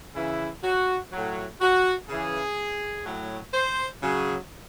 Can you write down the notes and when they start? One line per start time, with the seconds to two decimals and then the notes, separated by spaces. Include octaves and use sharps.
0.15 C#3 E3 E4
0.64 F#4
1.12 A2 F#3
1.61 F#4
2.09 C#3 E3 G#4
3.05 A2 F#3
3.54 C5
4.02 C#3 F#3 G#4